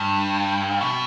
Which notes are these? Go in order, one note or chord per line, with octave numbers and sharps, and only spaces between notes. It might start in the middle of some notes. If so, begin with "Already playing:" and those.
Already playing: G2
B2